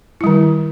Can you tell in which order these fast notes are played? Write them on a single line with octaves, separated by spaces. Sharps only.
E4 G3 D#3